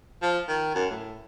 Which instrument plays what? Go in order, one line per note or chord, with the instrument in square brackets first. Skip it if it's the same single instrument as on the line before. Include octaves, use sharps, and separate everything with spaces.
[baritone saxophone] F3
D#3
F#2
A2